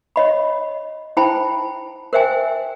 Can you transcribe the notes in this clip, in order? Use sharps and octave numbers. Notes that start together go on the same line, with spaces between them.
C#5 D#5 B5
E4 C5 G5 A5 B5
A#4 C5 E5 G5 G#5